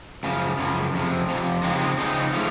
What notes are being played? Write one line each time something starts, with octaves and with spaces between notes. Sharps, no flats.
F#2 C#3 F3
F#2 C#3 F3
F2 C3 F3
F2 C3 F3
C#3 F3 G#3 C4 D#4
C#3 F3 G#3 C4 D#4
C#3 F3 A3